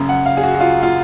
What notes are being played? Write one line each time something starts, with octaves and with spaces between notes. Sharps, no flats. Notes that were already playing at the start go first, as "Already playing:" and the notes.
Already playing: F#2 C#3
F#5
F5
G#4
F#4
F#4
F4
F4